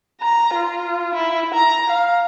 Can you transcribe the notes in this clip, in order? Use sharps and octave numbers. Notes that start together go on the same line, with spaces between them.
A#5
F4
E4
A#5
F5